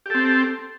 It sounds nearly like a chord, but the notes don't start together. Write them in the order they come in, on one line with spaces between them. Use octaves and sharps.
G4 A4 C4